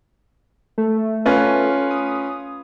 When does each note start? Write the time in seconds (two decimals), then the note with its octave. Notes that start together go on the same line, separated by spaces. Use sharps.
0.78 A3
1.26 C#4 F4 B4
1.91 D#6